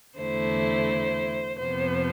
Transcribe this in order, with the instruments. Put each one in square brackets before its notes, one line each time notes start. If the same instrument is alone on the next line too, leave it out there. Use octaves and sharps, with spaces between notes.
[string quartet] E2 D3 A3 E4 C5
F2 C3 F3 B3 C5